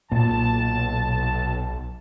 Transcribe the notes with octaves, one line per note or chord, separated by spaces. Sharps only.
B1 A#2 A5